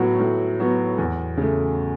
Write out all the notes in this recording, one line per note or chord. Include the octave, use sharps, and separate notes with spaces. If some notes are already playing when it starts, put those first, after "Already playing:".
Already playing: A2 F#3 B3 F#4
A2
F#3 B3 F#4
E2
C#3 A3